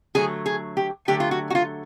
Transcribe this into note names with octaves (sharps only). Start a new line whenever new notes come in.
D3 F#3 A3 G#4
G#4
G4
D3 F#3 A3 G4
F4
F#4
F#4
F4